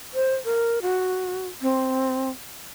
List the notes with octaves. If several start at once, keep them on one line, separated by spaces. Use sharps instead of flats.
C5
A#4
F#4
C4